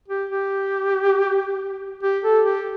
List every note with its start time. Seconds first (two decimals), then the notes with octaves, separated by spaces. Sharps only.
0.08 G4
0.30 G4
2.03 G4
2.24 A4
2.45 G4